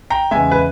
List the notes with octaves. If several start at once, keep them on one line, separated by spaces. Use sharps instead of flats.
G5 A#5
E2 C#3 G#3 E5 G#5
B4